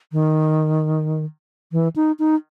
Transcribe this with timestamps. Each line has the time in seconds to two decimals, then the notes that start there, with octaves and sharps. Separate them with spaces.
0.12 D#3
1.72 E3
1.96 D#4
2.19 D#4